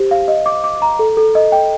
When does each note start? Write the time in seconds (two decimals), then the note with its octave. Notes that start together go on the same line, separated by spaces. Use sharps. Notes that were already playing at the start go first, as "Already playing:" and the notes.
Already playing: G4 C5
0.11 F5
0.28 D#5
0.46 D6
0.64 D6
0.82 A#5
0.99 A4
1.17 A4
1.35 D#5
1.52 G5